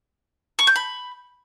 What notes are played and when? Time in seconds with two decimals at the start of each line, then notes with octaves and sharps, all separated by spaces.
0.59 C#6
0.67 G6
0.76 B5